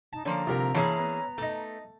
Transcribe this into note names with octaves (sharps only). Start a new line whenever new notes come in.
D#4 A5
D3 F3 A#3 C#4 D5 A#5
C2 F4 G4 A#4
E3 A#3 C#4 D4 E4 G#4 A5
B3
A3 D#4 D6